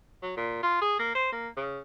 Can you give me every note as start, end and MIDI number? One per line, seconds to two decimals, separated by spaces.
0.22 0.37 54
0.37 0.61 46
0.63 0.77 65
0.81 0.99 68
0.99 1.12 58
1.15 1.30 72
1.32 1.48 58
1.57 1.79 49